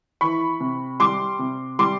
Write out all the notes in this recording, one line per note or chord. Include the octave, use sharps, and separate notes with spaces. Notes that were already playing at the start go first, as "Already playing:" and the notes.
E3 B5 C#6
C3
G3 C6 D6
C3
G3 C6 D6